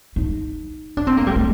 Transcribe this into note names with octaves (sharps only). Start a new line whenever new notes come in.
D#4
D4
C4
A#3
G3
A3